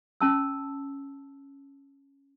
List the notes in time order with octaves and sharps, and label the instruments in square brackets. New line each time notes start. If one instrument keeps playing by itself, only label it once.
[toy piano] C#4 A5 E6